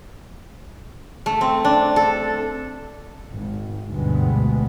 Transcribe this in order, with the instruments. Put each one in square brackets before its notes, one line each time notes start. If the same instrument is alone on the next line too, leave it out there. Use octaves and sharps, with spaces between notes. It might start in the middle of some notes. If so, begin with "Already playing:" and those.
[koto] A3
C4
D4
A4
[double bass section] G#1
D2 G2 B2 G#3 B3